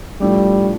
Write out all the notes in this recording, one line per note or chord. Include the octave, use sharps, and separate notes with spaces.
A2 F3 G3 A3 D4 G4